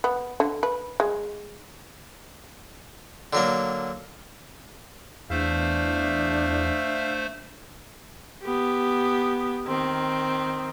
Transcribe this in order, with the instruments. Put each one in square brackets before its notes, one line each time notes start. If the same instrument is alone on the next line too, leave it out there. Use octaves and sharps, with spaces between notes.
[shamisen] B3
D3
B4
G#3
[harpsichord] D3 F#3 A#3
[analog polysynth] E2 [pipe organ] A3 C5 [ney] D4 [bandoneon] E5 F5
[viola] B3 G4
D#3 C4